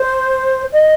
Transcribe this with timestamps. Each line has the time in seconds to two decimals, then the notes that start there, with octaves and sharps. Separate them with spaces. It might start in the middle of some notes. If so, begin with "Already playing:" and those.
Already playing: C5
0.73 D#5